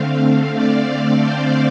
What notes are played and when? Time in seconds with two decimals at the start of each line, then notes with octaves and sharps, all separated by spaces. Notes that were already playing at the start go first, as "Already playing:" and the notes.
Already playing: D3 A3 C4 F5
0.53 D5
1.20 C5